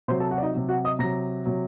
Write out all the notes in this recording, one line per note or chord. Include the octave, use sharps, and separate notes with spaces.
C3 F#3 C5 C6
A4 A5
F#4 F#5
D5
D#4 D#5
C3 F#3
F#4 F#5
D#5 D#6
C3 F#3 A#5 A#6
C3 F#3